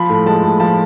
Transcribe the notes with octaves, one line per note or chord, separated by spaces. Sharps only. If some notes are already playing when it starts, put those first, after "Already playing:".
Already playing: F3 B5
A2
G#3 A5
A2
F3 A5